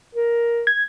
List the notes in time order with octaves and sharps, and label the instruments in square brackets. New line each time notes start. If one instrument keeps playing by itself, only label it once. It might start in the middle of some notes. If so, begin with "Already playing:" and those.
[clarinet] A#4
[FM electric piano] G#6